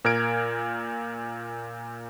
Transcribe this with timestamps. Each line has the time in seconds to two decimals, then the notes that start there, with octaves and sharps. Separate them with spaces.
0.05 A#2 A#4 F6 G#6 D7